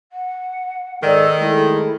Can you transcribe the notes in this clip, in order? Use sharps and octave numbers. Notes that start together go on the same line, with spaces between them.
F#5
G#2 D#3 A4 D5
G#3 A3 E4 A4